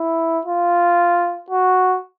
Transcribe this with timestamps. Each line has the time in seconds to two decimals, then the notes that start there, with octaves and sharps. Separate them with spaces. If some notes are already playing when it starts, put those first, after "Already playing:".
Already playing: E4
0.45 F4
1.50 F#4